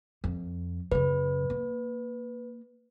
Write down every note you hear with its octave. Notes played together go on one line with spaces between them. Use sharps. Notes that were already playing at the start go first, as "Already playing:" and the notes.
F2
F#2 C#3 B4
A#3